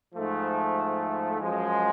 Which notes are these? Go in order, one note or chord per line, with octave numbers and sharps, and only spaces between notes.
G#2 F3 A3
F#2 F3 G#3